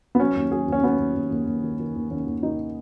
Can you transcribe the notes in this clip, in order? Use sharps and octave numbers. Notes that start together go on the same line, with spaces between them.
B3
F#3 C#4
D#2
F#3 G#4
D#2 C#4
F#3 B3
D#2
D#2
D#2
D#2
D#3
D#3
D#2
D#2 C#4
D#2
D#3 D#4